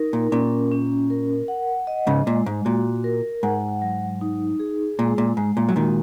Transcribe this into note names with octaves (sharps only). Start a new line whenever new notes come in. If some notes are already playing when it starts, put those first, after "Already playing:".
Already playing: D#4 A#4
A#2
A#2 C#4
C#4
A#4
F#5
D#5
G#2 C#3
A#2 G#3
G#2
A#2 F#4
A#4
G#2 F#5
F#3
D#4
G#4
A#2 G#3
A#2
G#2 G#3
A#2
F#3
A#2 D#3 F#4